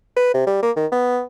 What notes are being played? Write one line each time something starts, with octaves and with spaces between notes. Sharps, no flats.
B4
C3
G3
A#3
D#3
B3